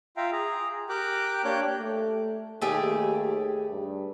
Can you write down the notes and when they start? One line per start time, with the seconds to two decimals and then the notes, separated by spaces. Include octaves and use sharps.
0.17 F4 E5 F5 G5 A#5
0.32 G#4 A#5
0.89 G4 A#4 G5 D6 F#6
1.44 A#3 D4 G4 C#5 F#6 G6
1.79 A3
2.62 D#2 A3 G4 G#4
3.70 G2